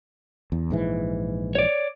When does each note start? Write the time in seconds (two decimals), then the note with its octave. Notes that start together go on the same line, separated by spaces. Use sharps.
0.52 E2
0.71 A#1 G#2 E3
1.55 C#5 D5